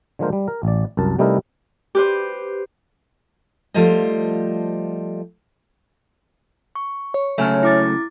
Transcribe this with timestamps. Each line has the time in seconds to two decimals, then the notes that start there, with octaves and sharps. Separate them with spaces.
0.19 D3 F3 G#3 A#3 A#4 C5
0.33 G3
0.48 A#4
0.63 A1 D5
0.97 C2 F#2 A#4 A5
1.18 C3 G3 A3 D#4 E4 A#4
1.95 G4 B4 C5
3.74 F3 G3 A3 F4 C5 D#5
6.75 C#6
7.14 C#5
7.38 C#3 F#3 A3 E5 G#5 F6
7.63 E4 D6 A6